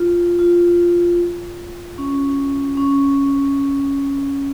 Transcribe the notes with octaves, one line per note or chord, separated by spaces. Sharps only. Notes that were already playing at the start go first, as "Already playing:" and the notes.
Already playing: F4
F4
C#4
C#4